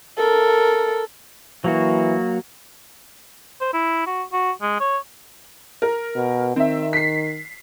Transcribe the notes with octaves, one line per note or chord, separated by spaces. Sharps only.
A4 A#4
E3 F#3 A#3 F#4
C5
E4
F#4
F#4
G#3
C#5
A#4
B2
D#3 C4 E5
B6 C7